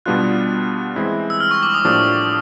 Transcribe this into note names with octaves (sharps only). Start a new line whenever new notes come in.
B2 G3 B3 D4 F4 F#6
E3 G#3 C4 E4
E6
F6
C#6
D6
D#6
A2 F3 A#3 D4 G4 E6